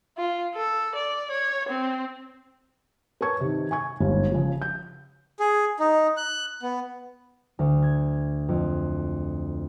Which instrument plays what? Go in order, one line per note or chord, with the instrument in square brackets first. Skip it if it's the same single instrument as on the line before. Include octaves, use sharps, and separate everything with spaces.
[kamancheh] F4
A4
D5
C#5
C4
[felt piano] A#4 B4 C#5 A5 C#6 G#6
C3 D#3
G#5 C#6 G#6
G1 D#2 G#2
C#3 F3
G6
[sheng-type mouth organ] G#4
D#4
F#6
B3
[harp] D2
G#6
F2